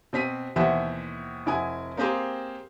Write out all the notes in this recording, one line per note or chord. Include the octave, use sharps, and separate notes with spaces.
B2 C4 B6 D#7
D#2 B2 E3 C5 E5 F#5
F1 E4 F#5 G#5 D#6
A#3 C4 G4 G#4 C5